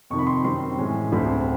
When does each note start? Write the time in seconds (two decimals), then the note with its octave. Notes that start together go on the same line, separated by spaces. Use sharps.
0.10 F2 C3 D#3 C#6
0.19 B5
0.27 C6
0.44 F#2 D#3 G3 C4 C6
0.79 A2 E3 G#3 C#4
1.12 D2 D3 G3 C4 B5